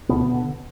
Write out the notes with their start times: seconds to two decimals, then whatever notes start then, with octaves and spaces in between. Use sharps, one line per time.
0.09 D2 B2 B3
0.34 D3